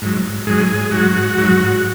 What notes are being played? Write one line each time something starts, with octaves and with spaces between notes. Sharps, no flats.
G#2 F#3
G#2 F#3 G#4
G#2 F#3 F#4
G#2 F#3